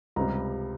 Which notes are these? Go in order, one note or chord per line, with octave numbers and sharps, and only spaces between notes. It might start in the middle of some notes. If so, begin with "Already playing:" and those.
C#2 C3 G3 A#5